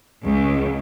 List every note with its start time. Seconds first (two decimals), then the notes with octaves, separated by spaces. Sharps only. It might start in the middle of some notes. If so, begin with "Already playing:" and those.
0.24 C#2